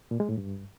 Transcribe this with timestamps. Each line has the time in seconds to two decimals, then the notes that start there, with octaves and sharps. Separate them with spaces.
0.11 A#2
0.20 G#3
0.29 A2
0.38 G2